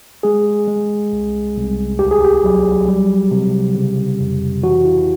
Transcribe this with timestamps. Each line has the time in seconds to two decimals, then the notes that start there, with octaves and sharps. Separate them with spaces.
0.23 G#3 G#4
0.67 G#3
1.12 C2
1.56 C2
1.99 D2 G4
2.11 G#4
2.24 G4
2.44 F#3
2.88 G3
3.31 C3
3.75 C#3
4.20 F2
4.63 E3 F#4
4.85 E4